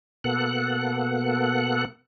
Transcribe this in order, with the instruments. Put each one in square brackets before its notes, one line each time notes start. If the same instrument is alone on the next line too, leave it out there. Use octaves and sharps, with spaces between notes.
[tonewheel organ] B2 A#3 B3 A4 F#5 F#6